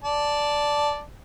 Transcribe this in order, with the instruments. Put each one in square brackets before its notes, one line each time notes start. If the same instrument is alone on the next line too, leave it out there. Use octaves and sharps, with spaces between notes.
[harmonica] D5 A5